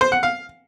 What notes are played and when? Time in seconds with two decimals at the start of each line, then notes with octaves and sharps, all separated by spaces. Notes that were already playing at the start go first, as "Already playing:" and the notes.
0.01 C5
0.12 F#5
0.23 F5